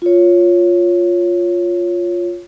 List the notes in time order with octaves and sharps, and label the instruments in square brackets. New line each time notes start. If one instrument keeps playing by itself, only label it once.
[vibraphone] F4 C#5